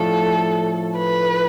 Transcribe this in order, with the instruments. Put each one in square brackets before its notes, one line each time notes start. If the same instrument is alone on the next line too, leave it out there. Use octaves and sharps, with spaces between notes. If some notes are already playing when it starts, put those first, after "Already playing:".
Already playing: [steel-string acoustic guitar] A2 F3 A3 D4 [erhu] A4
[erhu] B4